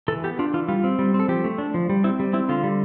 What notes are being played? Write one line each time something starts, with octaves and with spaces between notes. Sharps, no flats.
E3 A4
B3 G4
D4 F4
E3 F4
G3 F4
C4
G3
C4
A4
F3 G4
A3
D4
F3
G3
C4 E4
G3
C4 E4
D3 F4
G3